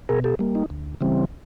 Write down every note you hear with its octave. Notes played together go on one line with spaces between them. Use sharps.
B2 G#4 A#4
G4 A4
G3 A#3
D#4
D2
C#3 E3 G3 C4